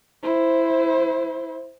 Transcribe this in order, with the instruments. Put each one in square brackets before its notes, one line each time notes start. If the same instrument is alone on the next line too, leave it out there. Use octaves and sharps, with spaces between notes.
[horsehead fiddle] E4 C5